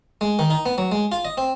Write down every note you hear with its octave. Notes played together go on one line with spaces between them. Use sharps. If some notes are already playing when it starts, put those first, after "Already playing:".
G#3
D#3
D#4
B3
F#3
G#3
F4
D#5
C4